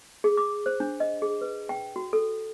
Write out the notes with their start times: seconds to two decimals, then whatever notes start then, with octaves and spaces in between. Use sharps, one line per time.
0.24 G#4
0.37 D6
0.66 C5
0.80 D4
1.00 D#5
1.22 G#4
1.41 B4
1.69 G5
1.96 F#4
2.13 A4